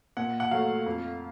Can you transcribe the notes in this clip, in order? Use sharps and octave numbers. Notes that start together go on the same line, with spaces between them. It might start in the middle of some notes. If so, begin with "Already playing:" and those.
A#2 F#5
F#5
F#3 A3 F5
F2